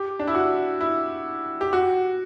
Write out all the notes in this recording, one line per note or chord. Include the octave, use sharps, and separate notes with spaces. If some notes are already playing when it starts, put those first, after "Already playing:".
Already playing: G4
D4
E4
F#4
E4
G4
F#4